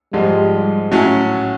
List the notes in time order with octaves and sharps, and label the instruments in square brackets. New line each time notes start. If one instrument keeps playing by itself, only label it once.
[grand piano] G#2 F3 G#3 [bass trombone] G3
[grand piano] A2 F#3 A3 C#4